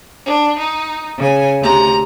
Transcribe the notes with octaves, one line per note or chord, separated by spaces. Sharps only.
D4
D#4
C#3 G#5
D2 C3 A#5